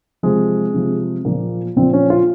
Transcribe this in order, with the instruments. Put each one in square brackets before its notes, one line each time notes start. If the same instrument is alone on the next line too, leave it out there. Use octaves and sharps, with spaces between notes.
[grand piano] C3 F3 G#3
C3 F3
A#2 F3 A#3
A#2 F3 C4
C#4
F4